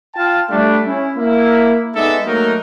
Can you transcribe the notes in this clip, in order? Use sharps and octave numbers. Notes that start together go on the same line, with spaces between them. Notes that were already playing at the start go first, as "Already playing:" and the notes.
F4 F5 G5 A5
G3 A3 D4
C#4 E4
A#3 E4
G#3 B3 D#4 A4 D5 E5
F#3 A3 A#3 D#4 F#4 A#4